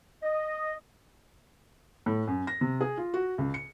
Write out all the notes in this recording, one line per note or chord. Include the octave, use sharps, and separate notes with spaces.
D#5
A2
F#2
A#6
C3
G#4
F4
F#4
C#2
C#7